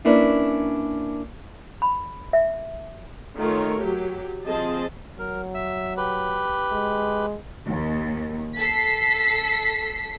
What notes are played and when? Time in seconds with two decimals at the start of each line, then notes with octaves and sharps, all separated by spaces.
0.05 A#3 C#4 D4 E4 A#4 B4
1.82 B5
2.33 E5
3.37 D#3 A3 F4 A#4 C#5
3.79 F#3 G4
4.45 F3 C4 G#4 D#5 A5
5.19 F#3 A#4
5.54 E5
5.97 G4 B4
6.71 G#3
7.67 D#2
8.57 A4 B6 C7